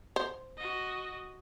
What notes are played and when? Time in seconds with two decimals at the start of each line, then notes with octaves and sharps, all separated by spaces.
0.16 C5
0.57 F#4 D#5